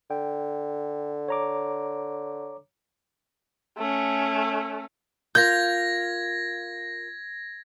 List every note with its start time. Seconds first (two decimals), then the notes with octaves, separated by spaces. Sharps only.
0.11 D3 G5
1.28 C#5 A#5 D6
3.78 A3 C#4
5.35 F4 A#4 F5 G6 G#6 A#6